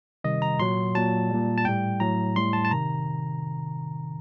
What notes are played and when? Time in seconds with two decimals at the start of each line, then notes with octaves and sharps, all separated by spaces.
0.24 C3 D#3 G3 D#5
0.42 A#5
0.59 A#2 F#3 C6
0.95 A#2 F#3 A5
1.30 A#2 G3
1.58 A5
1.65 A2 G3 G5
2.00 A2 F#3 A#5
2.36 A2 G3 C6
2.53 A5
2.65 A5
2.71 C3 D#3 A#5